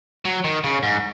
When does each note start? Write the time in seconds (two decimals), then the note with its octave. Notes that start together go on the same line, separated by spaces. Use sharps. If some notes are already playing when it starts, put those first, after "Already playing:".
0.25 F#3
0.44 D#3
0.64 C#3
0.83 G#2